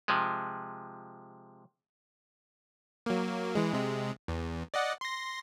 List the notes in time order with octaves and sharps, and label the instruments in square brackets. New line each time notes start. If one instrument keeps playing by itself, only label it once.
[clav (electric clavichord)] C3 F3 G#3
[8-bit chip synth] F#3 A#3
E3 G#3
C3 G#3
E2
D5 D#5 F#5
C6 A#6